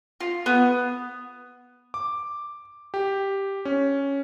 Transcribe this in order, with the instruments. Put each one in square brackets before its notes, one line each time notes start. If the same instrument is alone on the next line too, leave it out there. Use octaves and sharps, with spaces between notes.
[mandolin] F4
B3
[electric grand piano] D6
G4
C#4